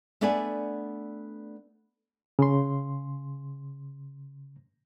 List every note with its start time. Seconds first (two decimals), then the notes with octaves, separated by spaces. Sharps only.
0.21 A3 B3 D4 D5 F#5 G#5
2.39 C#3 C6